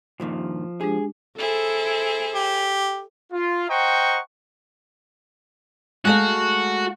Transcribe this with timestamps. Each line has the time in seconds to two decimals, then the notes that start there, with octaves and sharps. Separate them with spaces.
0.20 G2 A#2 D#3 F3
0.81 G#3 D4 G4 G#4
1.38 E4 G#4 A4 C5
2.35 G4
3.33 F4
3.69 C5 D#5 F#5 G5 A#5 C#6
6.05 G#3 A3 F#4 F5